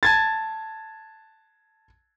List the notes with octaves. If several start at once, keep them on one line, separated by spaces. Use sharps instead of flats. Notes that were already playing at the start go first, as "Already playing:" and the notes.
A5 G#6 A6